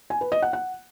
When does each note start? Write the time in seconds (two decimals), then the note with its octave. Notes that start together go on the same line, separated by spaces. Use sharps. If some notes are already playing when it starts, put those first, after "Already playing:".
0.10 G#5
0.21 B4
0.32 D#5
0.42 F#5
0.53 F#5